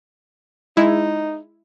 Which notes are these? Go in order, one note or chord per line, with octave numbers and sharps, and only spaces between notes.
G#3 D#4 E4